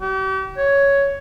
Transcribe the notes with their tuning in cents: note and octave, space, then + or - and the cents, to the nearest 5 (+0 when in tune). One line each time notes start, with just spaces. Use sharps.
G4 -40
C#5 +5